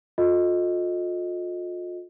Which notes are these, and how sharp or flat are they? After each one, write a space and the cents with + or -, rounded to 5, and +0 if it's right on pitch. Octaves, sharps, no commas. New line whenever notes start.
F4 +35 A4 +0 D#5 +0